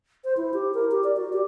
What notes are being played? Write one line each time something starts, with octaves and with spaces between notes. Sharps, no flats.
C5
E4
G4
A#4
G4
D5
F#4
G4